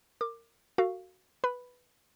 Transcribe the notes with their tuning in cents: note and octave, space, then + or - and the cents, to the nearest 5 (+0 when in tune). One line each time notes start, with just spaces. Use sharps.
A#4 -20 D6 +15
F#4 +0 A4 +40 F5 +0
B4 +0 B5 +0